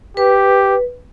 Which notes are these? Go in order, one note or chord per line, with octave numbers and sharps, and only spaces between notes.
G4 B4